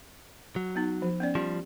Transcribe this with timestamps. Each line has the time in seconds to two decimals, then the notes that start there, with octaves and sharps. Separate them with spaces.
0.56 F#3
0.76 B3 D#4
1.02 F3
1.20 B3 C#4 D5
1.35 F3 G3 G4